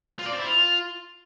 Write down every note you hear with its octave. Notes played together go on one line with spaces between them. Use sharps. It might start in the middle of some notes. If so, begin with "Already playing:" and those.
F4
D5
C4
E4
F4